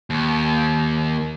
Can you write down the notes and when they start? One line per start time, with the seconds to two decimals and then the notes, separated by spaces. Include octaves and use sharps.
0.10 D#2